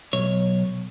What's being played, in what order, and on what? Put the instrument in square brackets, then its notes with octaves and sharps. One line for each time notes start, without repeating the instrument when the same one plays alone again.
[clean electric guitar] B1 C#5